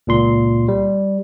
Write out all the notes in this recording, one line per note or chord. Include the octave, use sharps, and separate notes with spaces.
C#2 A#2 C6
G3